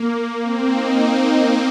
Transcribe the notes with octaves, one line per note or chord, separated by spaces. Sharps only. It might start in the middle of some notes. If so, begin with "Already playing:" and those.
Already playing: A#3
C4
D#4